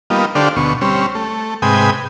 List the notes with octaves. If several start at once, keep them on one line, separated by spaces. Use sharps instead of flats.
G3 A#3 B3 D#4 F4
D3 D4 G4 A4 C5 F5
D2 B2 C#6
G3 C4 C#4
A3
G#2 C3 B4 G5 G#5 D#6